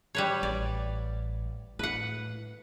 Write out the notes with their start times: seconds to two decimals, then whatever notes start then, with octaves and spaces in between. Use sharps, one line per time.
0.15 G3 B4 C#5
0.43 A1 D5
1.79 A2 B4 F#5